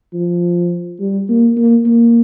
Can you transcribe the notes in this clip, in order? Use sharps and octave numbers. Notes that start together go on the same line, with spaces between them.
F3
G3
A#3
A#3
A#3